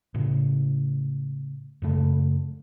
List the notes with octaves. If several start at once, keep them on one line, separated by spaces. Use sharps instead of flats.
A2 C#3
F#2 C#3 A3